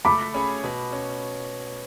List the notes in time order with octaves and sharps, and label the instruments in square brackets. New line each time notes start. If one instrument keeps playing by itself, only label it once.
[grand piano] A3 [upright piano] B5 D6
[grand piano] C#4 G#4 C#5
B2
C#4